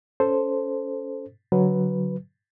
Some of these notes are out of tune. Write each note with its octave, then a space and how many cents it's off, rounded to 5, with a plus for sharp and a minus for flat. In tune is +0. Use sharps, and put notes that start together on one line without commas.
C#4 +15 A4 +0 C5 +0
D3 -30 F#3 +0 B4 +0